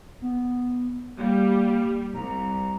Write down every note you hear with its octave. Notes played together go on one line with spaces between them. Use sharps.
B3
G3 A#3
C2 A#5